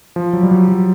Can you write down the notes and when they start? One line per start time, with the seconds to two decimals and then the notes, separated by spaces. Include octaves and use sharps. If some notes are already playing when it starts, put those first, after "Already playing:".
0.16 F3
0.33 F#3
0.43 G3
0.51 F#3
0.68 F#3